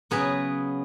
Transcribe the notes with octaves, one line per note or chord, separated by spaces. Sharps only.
C#3 F#3 B3 G#4 B4